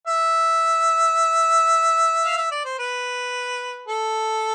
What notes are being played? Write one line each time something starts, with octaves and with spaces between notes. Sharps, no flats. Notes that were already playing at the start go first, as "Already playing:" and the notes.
E5
F5
E5
D5
C5
B4
A4